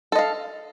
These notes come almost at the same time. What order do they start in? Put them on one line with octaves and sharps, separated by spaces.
A4 D#5 F5